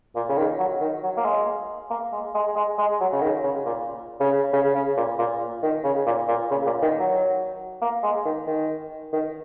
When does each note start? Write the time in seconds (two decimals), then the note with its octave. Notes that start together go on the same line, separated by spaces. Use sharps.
0.16 A#2
0.29 C#3
0.37 D#3
0.59 F#3
0.81 D#3
1.03 F#3
1.17 A#3
1.25 G#3
1.91 A#3
2.12 G#3
2.34 G#3
2.56 G#3
2.78 G#3
3.00 F#3
3.13 C#3
3.22 D#3
3.44 C#3
3.66 A#2
4.21 C#3
4.53 C#3
4.75 C#3
4.97 A#2
5.19 A#2
5.63 D#3
5.84 C#3
6.06 A#2
6.28 A#2
6.51 C#3
6.67 A#2
6.83 D#3
7.00 F#3
7.82 A#3
8.03 G#3
8.25 D#3
8.47 D#3
9.13 D#3